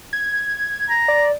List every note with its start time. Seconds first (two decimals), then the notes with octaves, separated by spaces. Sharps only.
0.13 G#6
0.90 A#5
1.08 D5